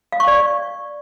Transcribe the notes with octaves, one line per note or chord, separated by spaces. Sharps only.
F5
C#6
D5